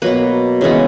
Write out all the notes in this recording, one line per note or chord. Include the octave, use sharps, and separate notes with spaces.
B2 F#3 A#3 B4
C#3 E3 G#3 B3